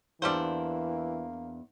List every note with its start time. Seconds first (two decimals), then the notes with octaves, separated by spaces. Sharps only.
0.22 E2 E3 G3 A#3 D4 A4 C5